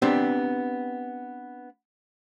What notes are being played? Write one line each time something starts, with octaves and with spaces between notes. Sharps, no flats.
B3 C4 D4 G4